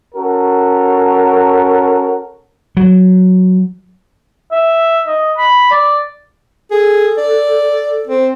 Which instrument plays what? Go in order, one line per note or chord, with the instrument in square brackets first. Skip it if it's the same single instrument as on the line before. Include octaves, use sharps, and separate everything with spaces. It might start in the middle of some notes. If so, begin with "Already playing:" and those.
[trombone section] C#4 F#4 A4 A#4
[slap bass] F#3
[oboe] E5
D#5
B5
D5
[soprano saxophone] G#4 [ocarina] A4
[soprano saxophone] D5
C4